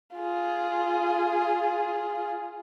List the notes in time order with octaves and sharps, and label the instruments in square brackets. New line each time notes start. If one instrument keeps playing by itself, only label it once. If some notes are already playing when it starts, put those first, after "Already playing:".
[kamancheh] F4 G#4